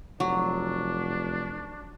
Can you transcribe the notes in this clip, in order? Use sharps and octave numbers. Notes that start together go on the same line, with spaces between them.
F1 F#3 D4 C#6